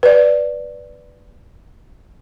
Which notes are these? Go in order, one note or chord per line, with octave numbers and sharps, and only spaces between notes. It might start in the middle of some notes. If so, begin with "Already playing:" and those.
B4 D5